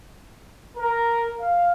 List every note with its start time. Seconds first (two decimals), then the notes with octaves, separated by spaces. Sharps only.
0.77 A#4
1.38 F5